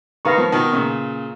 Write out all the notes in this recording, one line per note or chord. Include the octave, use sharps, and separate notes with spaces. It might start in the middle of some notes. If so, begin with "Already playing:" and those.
D#3 B4 F5 A#5 C#6
F3
B2 D#3
A#2 C#3